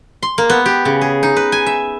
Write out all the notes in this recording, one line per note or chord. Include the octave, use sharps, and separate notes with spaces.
C6
A#3
B3
G4
C#3
G#4
D#4
B4
G#5
E5